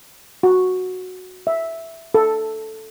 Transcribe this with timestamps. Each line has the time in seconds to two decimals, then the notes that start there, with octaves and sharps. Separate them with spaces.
0.43 F#4
1.47 E5
2.14 A4